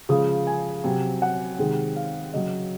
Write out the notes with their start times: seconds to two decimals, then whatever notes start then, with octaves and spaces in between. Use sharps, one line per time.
0.09 C#3 F3 G#3 D#6
0.47 G#5
0.84 C3 F#3
1.22 F#5
1.59 C3 D#3 G#3
1.96 F5
2.34 C#3 F#3 D#5